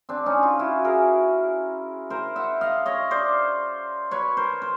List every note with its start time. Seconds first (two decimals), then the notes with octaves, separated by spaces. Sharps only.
0.09 C4 D4
0.26 C#4 D#4
0.43 D#4 F4
0.59 E4 F#4
0.84 G#4 A#4
2.10 A#4 C5
2.36 E5 F#5
2.61 D#5 F5
2.86 C#5 D#5
3.11 C5 D5
4.11 B4 C#5
4.37 A#4 C5
4.62 C5